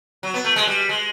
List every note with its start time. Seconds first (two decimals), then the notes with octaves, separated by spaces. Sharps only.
0.23 F#3
0.34 B3
0.44 A3
0.56 G#3
0.67 G3
0.89 G#3